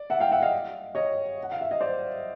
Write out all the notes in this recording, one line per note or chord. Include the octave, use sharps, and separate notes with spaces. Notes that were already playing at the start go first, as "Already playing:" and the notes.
Already playing: D5
E5 F#5
F5 G5
E5 F#5
D#5 F5
C#5 D#5
F#5
F5
E5
D#5
C5 D5